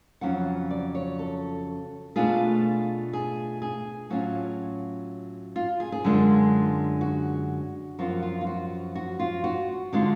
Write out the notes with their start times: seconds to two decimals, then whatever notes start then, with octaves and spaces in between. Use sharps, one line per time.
0.21 F2 C#3 F#3 C#4 F4 F#5
0.70 D5
0.95 C#5
1.19 A4
2.16 B2 A3 D4 F4 G#4
3.13 G#4
3.62 G#4
4.10 A2 F#3 C#4 F4 F#4
5.56 F4
5.80 G#4
5.92 G#4
6.04 F#2 D3 G#3 D4 F4
7.01 F#4
7.99 F#2 F3 B3 F4 F#4
8.23 F4
8.41 F4
8.47 F#4
8.95 F#4
9.19 F4
9.44 F#4
9.93 D3 G#3 D4 F4